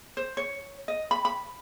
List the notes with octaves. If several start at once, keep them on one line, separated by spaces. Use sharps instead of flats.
C5
C#5
D#5
B5
B5